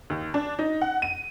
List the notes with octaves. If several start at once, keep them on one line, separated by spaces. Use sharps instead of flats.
D#2
D4
D#4
F#5
D#7